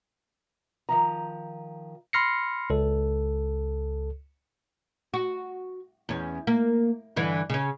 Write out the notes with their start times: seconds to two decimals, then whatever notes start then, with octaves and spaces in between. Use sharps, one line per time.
0.89 D#3 F3 A#5
2.13 B5 C6 F6 A#6 C7 C#7
2.70 C#2 A4
5.14 F#4
6.09 E2 C#4
6.47 A#3
7.16 G2 D3 E3
7.50 C#3 C#4